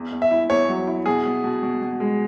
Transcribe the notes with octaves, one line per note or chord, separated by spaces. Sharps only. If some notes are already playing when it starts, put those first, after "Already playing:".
Already playing: E2
E2
E5
E4
E2 C#5
F#3
E4
B2 G#4
B3
B2
B2
B2
G#3